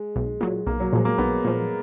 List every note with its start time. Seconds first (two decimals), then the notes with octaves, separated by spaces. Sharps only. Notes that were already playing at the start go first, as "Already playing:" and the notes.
Already playing: G#3
0.16 B1
0.41 A#2 F#3
0.67 B1 A#3
0.80 F#3
0.92 A#2 F3 G#3
1.05 A#3
1.18 B1 B3
1.44 A#2 F3